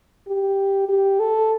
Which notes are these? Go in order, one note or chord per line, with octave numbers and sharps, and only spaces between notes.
G4
G4
A4